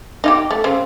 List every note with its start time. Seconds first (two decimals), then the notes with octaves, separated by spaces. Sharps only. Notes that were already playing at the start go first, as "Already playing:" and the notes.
0.24 D#4 F4 G4
0.51 A3
0.64 C#3 C4